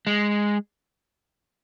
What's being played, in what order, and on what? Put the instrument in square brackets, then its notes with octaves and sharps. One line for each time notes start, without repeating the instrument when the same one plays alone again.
[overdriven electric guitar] G#3